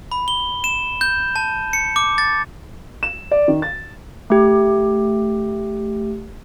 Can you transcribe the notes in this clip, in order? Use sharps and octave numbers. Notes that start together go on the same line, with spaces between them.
B5
G7
E7
G6
A5
C#7
D6
A6
E7
D5
D#3
A6
A3 G4